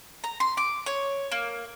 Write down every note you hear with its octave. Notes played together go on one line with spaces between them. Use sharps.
A#5
C6
D6
C#5
A#3